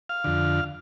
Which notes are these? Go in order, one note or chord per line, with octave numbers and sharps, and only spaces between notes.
F5
F2 D3